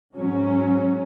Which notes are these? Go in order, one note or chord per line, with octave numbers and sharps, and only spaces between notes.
G#2 F#3 C#4